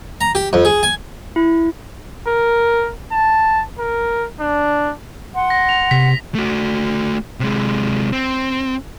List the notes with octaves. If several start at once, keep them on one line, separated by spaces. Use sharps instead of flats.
A#5
G4
F2
G#4
G#5
E4
A#4
A5
A#4
D4
F#5 C6
A#6
F7
C3 B6
A3 F#4
C3 G#3
C4